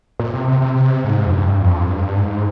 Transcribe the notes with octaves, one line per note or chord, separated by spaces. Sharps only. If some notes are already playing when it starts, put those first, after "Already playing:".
A#2
C3
C3
C3
C3
G#2
F2
G2
F2
G2
G#2